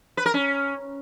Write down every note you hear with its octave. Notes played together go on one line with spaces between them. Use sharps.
B4
A#4
C#4